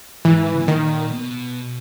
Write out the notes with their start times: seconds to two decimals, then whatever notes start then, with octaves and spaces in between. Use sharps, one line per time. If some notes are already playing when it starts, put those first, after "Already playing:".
0.25 G#2 E3
0.46 D#3
0.53 C#3
0.61 B2
0.68 A#2 D#3
1.12 B2